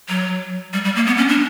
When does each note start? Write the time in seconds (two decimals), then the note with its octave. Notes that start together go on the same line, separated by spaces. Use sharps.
0.09 F#3
0.73 G3
0.85 G3
0.96 A#3
1.07 B3
1.17 C#4
1.29 D4